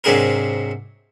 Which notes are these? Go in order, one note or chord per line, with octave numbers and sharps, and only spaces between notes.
G#2 C3 F#3 D4 G#4 A#4